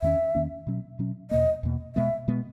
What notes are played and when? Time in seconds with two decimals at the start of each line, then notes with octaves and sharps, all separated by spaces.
0.02 E2 D#3 A#3 C#4 E5
0.35 E2 D#3 A#3 C#4
0.67 B2 F#3 C#4
0.99 B2 F#3 C#4
1.31 E2 B2 A#3 D#5
1.63 E2 B2 A#3
1.96 B2 G#3 B3 E5
2.28 B2 G#3 B3